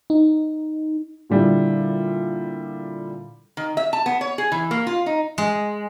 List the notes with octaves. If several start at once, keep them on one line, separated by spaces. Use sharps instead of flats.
D#4
A#2 D3 G3 E4
D#3
E5
A5
B3
C#5
G#4
E3
A#3
F4
D#4
G#3